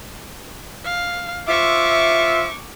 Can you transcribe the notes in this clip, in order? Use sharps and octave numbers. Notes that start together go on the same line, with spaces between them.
F5
F4 C5 E5 C#6 D6